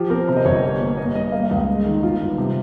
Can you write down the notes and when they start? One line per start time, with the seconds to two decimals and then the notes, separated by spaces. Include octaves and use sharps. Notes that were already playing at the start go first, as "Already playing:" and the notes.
Already playing: F3 G4
0.10 C4 A#4
0.28 C3 C5
0.37 D#5
0.45 G1 C#5
0.63 G3
0.80 A#3
0.97 A#3 D#5
1.15 G2 D#5
1.32 A#3 F5
1.44 F5
1.51 C#2
1.56 D#5
1.68 G#3
1.85 D#3
2.02 G1 F4
2.20 G2
2.38 C3